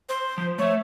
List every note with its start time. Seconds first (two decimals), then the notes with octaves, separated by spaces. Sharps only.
0.09 C5
0.38 F3
0.58 A3 C#5 E5